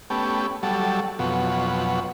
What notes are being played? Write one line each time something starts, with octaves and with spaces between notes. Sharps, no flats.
A3 B3 C#4 G4
F#3 G3 A4
F2 B2 F#3